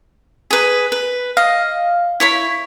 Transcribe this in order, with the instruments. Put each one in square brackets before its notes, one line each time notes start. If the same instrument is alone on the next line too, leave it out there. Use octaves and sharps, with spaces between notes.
[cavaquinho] G#4 B4
B4
[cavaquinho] D#5 [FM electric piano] F5
[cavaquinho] E4 C#5 B5